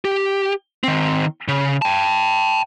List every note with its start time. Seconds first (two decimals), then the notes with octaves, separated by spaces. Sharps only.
0.05 G4
0.84 D#3 C4
1.48 C#3
1.82 G5 A5